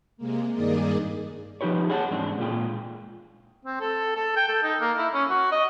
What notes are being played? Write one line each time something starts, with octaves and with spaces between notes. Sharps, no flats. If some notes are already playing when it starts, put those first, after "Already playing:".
C3 G#3 A#3
G2 D#3 A#3 G#4 D5 D#5
F3 D#4 G4 B4 C#5
G#4 C#5 F#5 G5 A5
E2 G#2 C4 D4
A#2 G#3 F4 G5
C4
A4
A4
G5
A4
D#4
A#3
E4
C#4
F#4
D#5